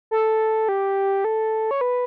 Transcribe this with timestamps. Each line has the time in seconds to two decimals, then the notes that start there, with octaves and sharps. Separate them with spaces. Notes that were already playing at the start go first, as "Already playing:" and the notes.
0.11 A4
0.69 G4
1.24 A4
1.71 C#5
1.81 B4